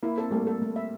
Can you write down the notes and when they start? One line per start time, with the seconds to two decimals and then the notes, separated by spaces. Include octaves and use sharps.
0.03 A#3 E4
0.17 C4 A4
0.31 G3 A3 A#3
0.47 A4
0.62 A3
0.76 E5